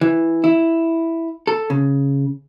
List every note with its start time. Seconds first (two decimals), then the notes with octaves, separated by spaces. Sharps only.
0.01 E3
0.44 E4
1.47 A4
1.70 C#3